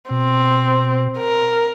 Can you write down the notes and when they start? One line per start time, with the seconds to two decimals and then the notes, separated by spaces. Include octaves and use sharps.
0.10 B2 C4
1.18 A#4